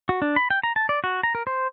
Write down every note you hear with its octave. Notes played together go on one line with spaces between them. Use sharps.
F#4
D4
B5
G5
A#5
A5
D5
F#4
A#5
A#4
C5